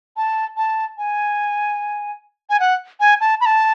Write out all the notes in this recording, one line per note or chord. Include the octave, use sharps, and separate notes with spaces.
A5
A5
G#5
G#5
F#5
G#5
A5
B5
A5